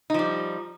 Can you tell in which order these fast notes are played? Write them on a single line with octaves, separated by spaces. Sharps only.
D#4 F3 G3